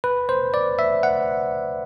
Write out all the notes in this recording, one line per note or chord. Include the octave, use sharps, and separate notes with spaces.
B4
C5
D5
E5
F#5